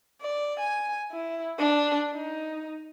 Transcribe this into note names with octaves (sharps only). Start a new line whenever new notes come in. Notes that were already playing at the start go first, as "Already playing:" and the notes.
D5
G#5
E4
D4
D#4